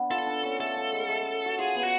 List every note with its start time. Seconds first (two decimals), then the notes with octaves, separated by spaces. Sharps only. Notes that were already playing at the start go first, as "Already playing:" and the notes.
Already playing: B3 D4
0.10 F4 A4
0.26 D4
0.43 C#4
0.60 A3 A4
0.76 A3
0.93 G#3
1.09 A3
1.21 C#4
1.46 F#4
1.59 F4 G#4
1.75 B3
1.83 F#4